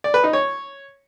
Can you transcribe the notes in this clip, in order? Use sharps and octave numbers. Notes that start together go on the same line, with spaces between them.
D5
B4
D#4
C#5